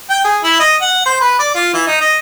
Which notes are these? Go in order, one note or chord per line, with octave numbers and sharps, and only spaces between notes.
G5
G#4
E4
D#5
F#5
C5
B4
D5
F4
E3
D#4
D#5